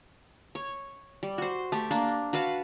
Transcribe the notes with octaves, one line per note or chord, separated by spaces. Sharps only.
C#5
G3
F#4 C5
A3 G4
A#3 D4
F#4 B4 F5 A5